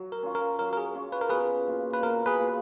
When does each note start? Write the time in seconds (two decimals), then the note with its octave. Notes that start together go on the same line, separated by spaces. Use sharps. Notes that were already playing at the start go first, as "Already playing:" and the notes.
Already playing: F#3
0.12 A#4
0.23 C#4 F4
0.35 A#4
0.59 F#3 A#4
0.73 A#4
0.77 G#4
0.95 C#4 F4
1.12 B4
1.21 A#4
1.29 B2 G#4 B4
1.67 A#3 F4
1.93 B4
2.02 B2 A#4
2.26 G#4 B4
2.39 A#3 F4